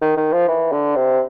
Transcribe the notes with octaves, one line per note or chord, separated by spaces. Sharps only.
D#3
D#3
F3
E3
D3
C3